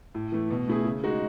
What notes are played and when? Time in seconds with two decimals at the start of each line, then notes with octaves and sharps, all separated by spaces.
0.15 A2
0.32 E3 A3
0.51 B2
0.68 A3 E4 G#4
0.85 C#3
1.04 G#3 D#4 F#4